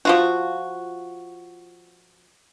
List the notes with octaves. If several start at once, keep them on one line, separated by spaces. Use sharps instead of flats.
F3 F4 F#4